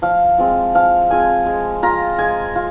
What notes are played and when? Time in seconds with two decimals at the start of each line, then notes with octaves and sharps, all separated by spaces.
0.02 F3 F5
0.38 G#3 C4 F4
0.75 F3 F5
1.10 G#3 C4 F4 G#5
1.46 G#3
1.83 F4 A#5
2.19 G#3 G#5
2.56 F4